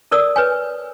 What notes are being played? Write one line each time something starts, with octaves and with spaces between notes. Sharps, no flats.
A4 A#4 D5 D#6 E6
B4 C#5 G#5